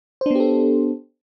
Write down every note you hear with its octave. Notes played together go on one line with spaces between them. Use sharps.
B3 D4 G4 A4 C5